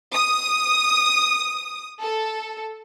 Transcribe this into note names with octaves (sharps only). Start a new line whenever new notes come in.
D#6
A4